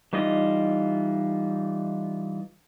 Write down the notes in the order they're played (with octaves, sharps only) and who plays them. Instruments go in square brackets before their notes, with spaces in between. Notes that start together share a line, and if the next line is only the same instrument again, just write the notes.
[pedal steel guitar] E3 G3 D#4 F4 D#5